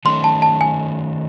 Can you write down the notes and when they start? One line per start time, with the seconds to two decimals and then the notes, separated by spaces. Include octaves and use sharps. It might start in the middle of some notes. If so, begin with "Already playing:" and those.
0.05 D#3 A3 C#4 C6
0.24 A5
0.42 A5
0.61 G#5